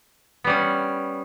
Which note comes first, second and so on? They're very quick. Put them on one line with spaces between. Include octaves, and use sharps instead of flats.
B3 G3 C#4